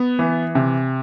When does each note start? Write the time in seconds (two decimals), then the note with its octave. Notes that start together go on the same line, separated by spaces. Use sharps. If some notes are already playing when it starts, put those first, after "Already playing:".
Already playing: B3
0.19 E3
0.55 C3